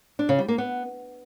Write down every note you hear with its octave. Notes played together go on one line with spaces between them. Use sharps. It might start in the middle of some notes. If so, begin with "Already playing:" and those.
D4
C#3
G3
A#3
B3